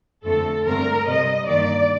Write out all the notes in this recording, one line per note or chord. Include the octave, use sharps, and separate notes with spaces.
F2 D3 A3 C4 A4
G2 D3 A3 C4 A#4
C3 G3 C4 D#5
G2 D#3 A#3 D5